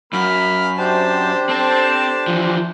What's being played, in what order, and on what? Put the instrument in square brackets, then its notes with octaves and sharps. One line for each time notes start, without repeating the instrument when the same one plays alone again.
[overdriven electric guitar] F#2 [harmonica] A#3 B5 F6
[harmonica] C4 A5 [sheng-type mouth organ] D4 G4 C5
[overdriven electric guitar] C4 [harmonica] A4 A5
[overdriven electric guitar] E3 F3